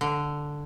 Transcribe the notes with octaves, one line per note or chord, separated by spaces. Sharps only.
D3